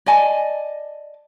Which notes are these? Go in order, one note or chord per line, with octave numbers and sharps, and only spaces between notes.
D5 D#5 G#5 A5